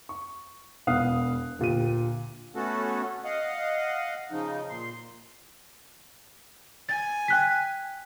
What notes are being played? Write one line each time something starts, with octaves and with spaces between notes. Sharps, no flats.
C#6
E1 B3 F5 D#6 F#6
D2 A#2 G4 D#7
A3 B3 C#4 F#4 A4
D#5 F5 F#5
C#3 F3 D#4
A#2 C6
G#5 A6
G5 F#6 B6